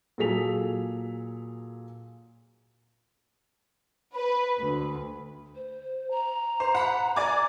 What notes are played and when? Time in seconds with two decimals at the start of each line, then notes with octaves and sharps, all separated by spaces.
0.18 A#2 F#3 G#4 A4 B6 F7
4.13 B4
4.60 D2
5.55 C5
6.11 A#5
6.60 C5
6.75 F#5 B5
7.16 D5 G#5 D6